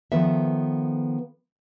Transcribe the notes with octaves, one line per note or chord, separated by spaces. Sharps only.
D#3 F3 B3 A4 E5